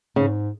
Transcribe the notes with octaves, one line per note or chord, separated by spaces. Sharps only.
G#2 C#3